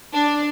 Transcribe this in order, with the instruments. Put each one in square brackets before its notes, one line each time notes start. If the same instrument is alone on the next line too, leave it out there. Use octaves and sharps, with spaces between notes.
[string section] D4